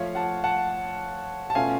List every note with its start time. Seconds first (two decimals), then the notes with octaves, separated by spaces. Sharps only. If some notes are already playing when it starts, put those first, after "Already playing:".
Already playing: F3 A3 F4 C#5 F5
0.15 F#5 A5
0.44 F#5 A5
1.50 A5
1.55 B2 A3 C#4 F4 F5 G#5